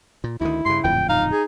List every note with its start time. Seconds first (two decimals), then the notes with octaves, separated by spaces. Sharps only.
0.24 A#2
0.41 D2 D#3 E4
0.66 G2 C#3 C6
0.84 D1 F2 A#2 G5
1.09 D#4 F5
1.32 G#4